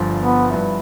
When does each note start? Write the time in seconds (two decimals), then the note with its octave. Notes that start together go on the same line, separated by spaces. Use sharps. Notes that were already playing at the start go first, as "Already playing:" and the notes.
Already playing: G1 G2 F3
0.20 B3
0.50 G2 F3 B3 E4